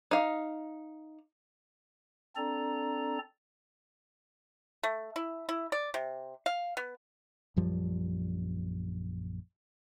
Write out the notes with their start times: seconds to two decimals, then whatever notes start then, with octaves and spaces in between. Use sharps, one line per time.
0.11 D#4 F5
2.36 C4 D4 A4 D5 A#5
4.83 A3
5.16 E4
5.49 E4
5.72 D5
5.94 C3
6.46 F5
6.77 B3
7.56 A#1 F#2 F3 G3